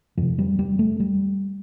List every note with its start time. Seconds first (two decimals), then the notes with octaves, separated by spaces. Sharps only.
0.17 F2 C3 F3
0.39 G3
0.59 G3
0.79 A3
1.00 G3